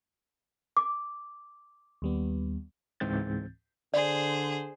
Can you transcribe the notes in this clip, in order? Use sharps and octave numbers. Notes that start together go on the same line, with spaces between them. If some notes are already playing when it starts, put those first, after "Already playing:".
D6
D#2 G3 B3
C#2 G#2 E3 C4 G6 A6
D3 G#4 C5 D5